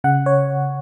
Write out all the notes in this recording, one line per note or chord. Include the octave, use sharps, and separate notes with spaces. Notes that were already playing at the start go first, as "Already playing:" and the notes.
C#3 F#5
C#5